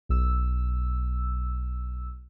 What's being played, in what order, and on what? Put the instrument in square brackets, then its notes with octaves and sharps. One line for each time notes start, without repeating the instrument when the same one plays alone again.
[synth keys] B1 E6